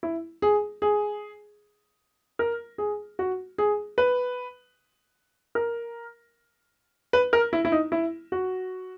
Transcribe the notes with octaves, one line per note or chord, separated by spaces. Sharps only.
E4
G#4
G#4
A#4
G#4
F#4
G#4
B4
A#4
B4
A#4
E4
E4
D#4
E4
F#4